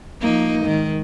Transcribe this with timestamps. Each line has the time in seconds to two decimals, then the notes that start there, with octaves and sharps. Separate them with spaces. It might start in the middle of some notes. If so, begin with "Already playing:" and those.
0.21 F3 A#3 D#4
0.63 G#2 D#3